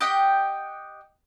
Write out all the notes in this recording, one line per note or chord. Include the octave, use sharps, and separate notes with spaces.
G4 D#5 F#5 G5